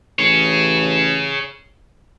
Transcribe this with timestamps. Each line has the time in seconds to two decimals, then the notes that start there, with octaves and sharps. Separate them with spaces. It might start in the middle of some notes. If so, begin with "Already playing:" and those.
0.19 A1 G#4 C#5